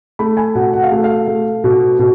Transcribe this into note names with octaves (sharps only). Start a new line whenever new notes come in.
A3 B5
G#5
B2 F#5
F#5
F5
A3
F5
A3
B2
B2